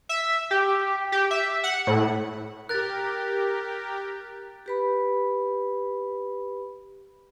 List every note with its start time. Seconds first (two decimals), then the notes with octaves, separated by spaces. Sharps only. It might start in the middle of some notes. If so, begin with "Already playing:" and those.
0.09 E5
0.51 G4
1.12 G4
1.31 E5
1.64 F#5
1.87 A2
2.69 G4 A#4 F#6 A6
4.66 G4 B4 B5